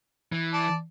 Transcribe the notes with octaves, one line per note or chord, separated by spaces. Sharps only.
E3
D5 A5